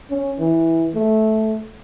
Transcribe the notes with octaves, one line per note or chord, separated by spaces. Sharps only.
C#4
E3
A3